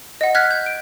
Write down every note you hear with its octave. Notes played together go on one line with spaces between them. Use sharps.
D#5 F#5
F6 F#6 G#6 B6
G6
D7